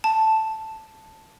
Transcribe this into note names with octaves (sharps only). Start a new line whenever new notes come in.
A5